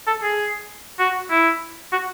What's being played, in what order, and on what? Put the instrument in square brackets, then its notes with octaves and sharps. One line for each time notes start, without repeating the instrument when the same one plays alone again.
[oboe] A4
G#4
F#4
E4
F#4